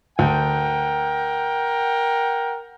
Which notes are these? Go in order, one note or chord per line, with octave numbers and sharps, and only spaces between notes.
D2 A#4 F#5 G5